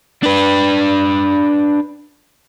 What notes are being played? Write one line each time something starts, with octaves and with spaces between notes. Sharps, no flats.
D4 B4